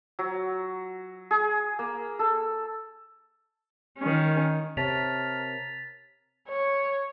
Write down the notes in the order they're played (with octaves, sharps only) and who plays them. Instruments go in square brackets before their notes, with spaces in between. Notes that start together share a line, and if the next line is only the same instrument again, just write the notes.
[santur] F#3
G#4
A#3
A4
[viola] D#3 C#4
[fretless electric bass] C3 [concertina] A#4 [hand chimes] C#5 A5 [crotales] A6 B6 F7
[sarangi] C#5